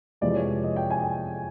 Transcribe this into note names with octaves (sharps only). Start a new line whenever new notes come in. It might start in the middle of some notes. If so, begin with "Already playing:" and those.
F2 C3 E3 G#3 D5
C#5
D#5
G5
G#5